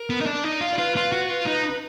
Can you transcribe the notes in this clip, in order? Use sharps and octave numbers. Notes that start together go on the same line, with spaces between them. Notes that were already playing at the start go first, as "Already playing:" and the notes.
Already playing: A#4
B3
D#4
D4
D#4
F4
D5
F4 B4
F4
F#4
F4
D#4